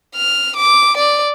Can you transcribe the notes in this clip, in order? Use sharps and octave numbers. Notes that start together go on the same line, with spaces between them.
F6
D6
D5